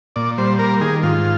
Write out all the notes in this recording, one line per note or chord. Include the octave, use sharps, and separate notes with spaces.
A#2 D5
G3 C5
A#3 A#4
D#3 G#4
G#2 F4